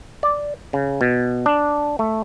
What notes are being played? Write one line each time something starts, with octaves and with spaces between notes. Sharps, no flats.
D5
C#3
B2
D4
A3